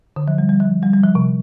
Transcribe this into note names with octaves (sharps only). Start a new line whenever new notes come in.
D3
F3
G3
G3
F3
G3
G3
F3
C3